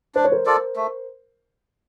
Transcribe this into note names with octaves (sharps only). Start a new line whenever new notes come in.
D4 C5
C#5
A#4 C5
F4 A4 D5
A3